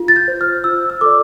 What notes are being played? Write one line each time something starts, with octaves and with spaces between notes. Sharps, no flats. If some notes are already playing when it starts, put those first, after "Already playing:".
Already playing: F4
A6
G6
C5
F6
F4 E6
E6
A4 D5 D6